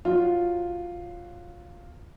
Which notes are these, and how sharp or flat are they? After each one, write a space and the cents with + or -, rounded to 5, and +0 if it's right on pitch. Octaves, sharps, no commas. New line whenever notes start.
F#3 +0 F4 +0 C#5 +0